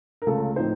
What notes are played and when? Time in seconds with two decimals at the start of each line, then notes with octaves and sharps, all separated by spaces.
0.22 A#4
0.26 C#2 C#3 A3 A4
0.56 A2 F3 C4 D#4 C5